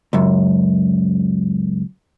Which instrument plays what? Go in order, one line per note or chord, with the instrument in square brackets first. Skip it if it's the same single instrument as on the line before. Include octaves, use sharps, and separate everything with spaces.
[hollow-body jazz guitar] C#2 F#2